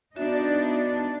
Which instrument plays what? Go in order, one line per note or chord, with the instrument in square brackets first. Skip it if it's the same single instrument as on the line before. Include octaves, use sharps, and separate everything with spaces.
[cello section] B3 D4 D#4 [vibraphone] F#4 E5